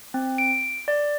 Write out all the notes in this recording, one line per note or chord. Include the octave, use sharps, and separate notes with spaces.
C4
D7
D5